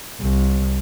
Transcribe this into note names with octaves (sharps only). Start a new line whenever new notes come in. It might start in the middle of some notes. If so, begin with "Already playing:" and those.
C2